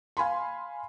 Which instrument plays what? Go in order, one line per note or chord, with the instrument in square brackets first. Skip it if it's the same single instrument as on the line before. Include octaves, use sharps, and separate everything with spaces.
[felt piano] F5 G#5 B5 C6